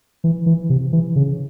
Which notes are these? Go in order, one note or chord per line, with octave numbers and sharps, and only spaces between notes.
E3
E3
C3
E3
C#3